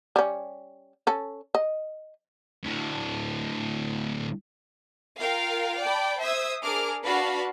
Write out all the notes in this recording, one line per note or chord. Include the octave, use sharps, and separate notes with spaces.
G3 C#4
C#4 A4
D#5
D2 A2
F4 A#4 F5 G5
D5 G5 A5 B5
C5 E5 D#6 E6 G#6
D4 G#4 A#4 D6 F6
D4 F#4 B4 F5 A5 B5